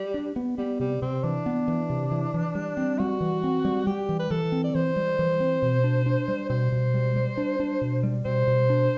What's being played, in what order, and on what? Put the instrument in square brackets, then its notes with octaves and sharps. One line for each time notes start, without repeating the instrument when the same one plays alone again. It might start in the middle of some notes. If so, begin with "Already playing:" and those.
Already playing: [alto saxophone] G3
[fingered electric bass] D4
B3
[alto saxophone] G3 [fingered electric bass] B3
[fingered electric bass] C3 [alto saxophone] G3
[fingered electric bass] C3 [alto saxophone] C4
[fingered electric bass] E3 [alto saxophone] D4
[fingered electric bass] B3
E3
C3
E3
E3
G3
C4
[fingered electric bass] G3 [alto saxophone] F#4
[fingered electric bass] E3
C4
G3
[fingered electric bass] G3 [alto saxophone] G4
[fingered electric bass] E3
[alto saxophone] B4
[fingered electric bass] E3 [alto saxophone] A4
[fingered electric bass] C4
[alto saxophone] D5
[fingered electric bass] E3 [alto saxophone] C5
[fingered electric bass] G3
E3
C4
B2
D4
D4
G3
[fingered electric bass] B2 [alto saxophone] C5
[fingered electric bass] B2
G3
G3
D4
D4
B2
G3
[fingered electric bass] B2 [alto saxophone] C5
[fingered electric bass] B2
D4